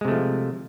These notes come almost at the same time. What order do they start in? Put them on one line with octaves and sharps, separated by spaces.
G#3 C3 A3 F3